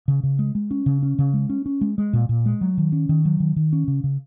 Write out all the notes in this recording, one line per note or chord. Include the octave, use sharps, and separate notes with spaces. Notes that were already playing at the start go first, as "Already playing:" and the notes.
C#3
C#3
G#3
G#3
C#4
C#3
C#4
C#3
G#3
C#4
C#4
G#3
G#3
A#2
A#2
G#3
F#3
D#3
C#4
D#3
F#3
D#3
D#3
C#4
C#3
C#3